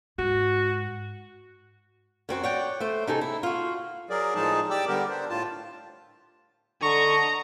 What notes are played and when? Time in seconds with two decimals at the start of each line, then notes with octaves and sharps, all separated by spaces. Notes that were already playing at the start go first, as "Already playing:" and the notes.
0.18 G#2 F#4
2.29 F#2 C4 F#4
2.43 C#5 D5 F#5 G5
2.80 A3 C5
3.07 C3 D#4 G#4 A4
3.21 E4
3.43 F4 F#4
4.10 F#3 G#4 A#4 D5
4.35 A2 F3 G#3 D#4 G#4 A5
4.70 G4 D5 G5 D6 E6
4.88 D3 G3 B3 G4 A#4
5.09 D4 C5
5.29 A2 F4 A5
6.82 D3 D#5 A#5 C#6